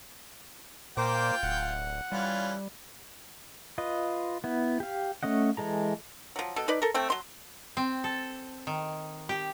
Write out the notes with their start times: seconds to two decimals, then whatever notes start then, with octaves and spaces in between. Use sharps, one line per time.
0.97 A#2 A#3 F4 C5 G5 D6
1.43 D1 F#5
2.12 E3 G3 C#4 F4
3.78 F4 B4 D#5
4.44 B3 E4
4.80 G4 F5
5.23 A3 C#4 D#5 F#5
5.57 E3 G#3 A4 A#5
6.36 F3 F#3
6.56 B2 A4
6.68 D#4 B4 D5
6.82 A4 A#4
6.94 A3 C4 G5
7.10 F#3 C6
7.77 C4
8.04 A4
8.67 D#3
9.29 G4